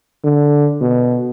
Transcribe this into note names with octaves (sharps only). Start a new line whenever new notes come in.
D3
B2